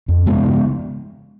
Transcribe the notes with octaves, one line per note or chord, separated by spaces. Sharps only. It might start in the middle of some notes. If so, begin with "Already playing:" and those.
F2
C#3 G#3 B3
C#3